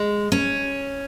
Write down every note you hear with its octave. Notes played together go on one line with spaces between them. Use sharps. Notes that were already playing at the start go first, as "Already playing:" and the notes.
Already playing: G#3
C#4